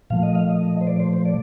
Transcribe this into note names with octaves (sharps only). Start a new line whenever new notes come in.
A#2 F3 A3 F5
D#5
F5
D#5
C5
D5
C5
C5
D5